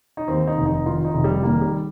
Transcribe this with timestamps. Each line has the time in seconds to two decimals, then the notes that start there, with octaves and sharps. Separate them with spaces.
0.17 D#4
0.28 D#2 C4
0.47 D#4
0.57 F1
0.66 D#4
0.86 D#3 F4
1.05 D#4
1.14 F1
1.24 G3
1.42 D#3 A#3
1.61 G3